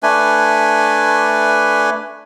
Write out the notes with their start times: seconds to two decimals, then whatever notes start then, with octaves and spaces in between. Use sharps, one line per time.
0.03 A3 D4 B4 G#5